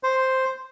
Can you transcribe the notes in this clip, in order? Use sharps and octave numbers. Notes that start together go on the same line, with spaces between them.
C5